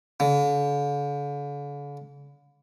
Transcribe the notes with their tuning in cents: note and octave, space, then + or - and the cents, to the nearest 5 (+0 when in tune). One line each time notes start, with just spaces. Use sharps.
D3 -45